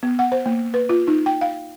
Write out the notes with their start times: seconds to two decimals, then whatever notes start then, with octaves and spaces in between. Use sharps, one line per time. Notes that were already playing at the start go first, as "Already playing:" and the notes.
0.03 B3
0.19 F#5
0.32 C5
0.46 A#3
0.74 B4
0.89 F4
1.08 D#4
1.26 G5
1.41 F5